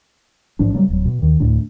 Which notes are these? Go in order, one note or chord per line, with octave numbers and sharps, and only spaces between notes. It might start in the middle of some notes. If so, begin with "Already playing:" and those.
A1 G#2 F3 D4
C3 F#3 G3 A#3
D1 F#3
B2
D#2 D#3
D2 A2 A3 D4